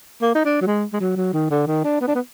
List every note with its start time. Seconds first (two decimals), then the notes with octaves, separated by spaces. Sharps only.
0.22 A#3
0.35 D#4
0.45 D4
0.61 F#3
0.67 G#3
0.93 G#3
1.00 F#3
1.17 F#3
1.33 D#3
1.50 D3
1.67 D#3
1.84 D4
2.01 B3
2.08 D4
2.15 B3